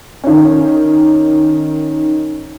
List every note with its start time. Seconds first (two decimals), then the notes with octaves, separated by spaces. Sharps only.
0.24 D#3 C#4